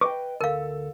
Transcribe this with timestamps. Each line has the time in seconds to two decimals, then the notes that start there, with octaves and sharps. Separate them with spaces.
0.01 B4 D#5 G5 C#6 D6
0.41 D2 A4 A#4 F5